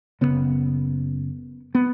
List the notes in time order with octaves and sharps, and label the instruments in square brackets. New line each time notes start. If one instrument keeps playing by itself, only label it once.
[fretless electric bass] F#1 E2 C#3 B3
B3